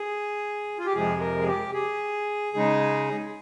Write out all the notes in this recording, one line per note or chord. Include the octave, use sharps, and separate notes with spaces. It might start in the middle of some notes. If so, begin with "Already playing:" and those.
Already playing: G#4
F4
G4
F2 C3 F3 G#3 G#4
A#4
G#4
G4
G#4
C#3 G#3 D#4